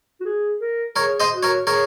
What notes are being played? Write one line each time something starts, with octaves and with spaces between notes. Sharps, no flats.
F#4
G#4
A#4
G#4 A#4 C#5
C5 D#5
F#4
A#4 C#5
G#4 A#4 C#5